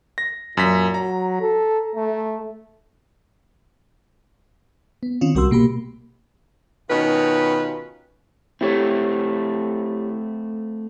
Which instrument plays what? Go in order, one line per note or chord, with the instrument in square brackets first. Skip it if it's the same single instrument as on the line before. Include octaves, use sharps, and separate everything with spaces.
[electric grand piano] A#6
[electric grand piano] F#2 B6 [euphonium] A#2
[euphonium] F#3 [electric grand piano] A#5
[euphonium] A4
A3
[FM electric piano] B3
D#3 C4 C#4 F4
C2 G3 F#4 A#4 C6 E6
B2 A#3 G4 B5
[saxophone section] B2 D#3 C#4 D#4 F4 B4
[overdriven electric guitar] A3 C4 [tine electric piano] E4 G4 C#5